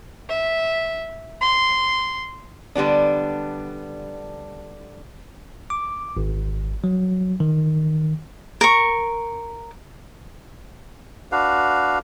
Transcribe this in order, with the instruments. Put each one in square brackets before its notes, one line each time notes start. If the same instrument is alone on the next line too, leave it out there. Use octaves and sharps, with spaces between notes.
[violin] E5
C6
[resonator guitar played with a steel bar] D3 G3 B3 D4
[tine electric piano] D6
G#1
F#3
D#3
[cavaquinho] A#4 C#6
[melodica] D4 F#4 B4 F5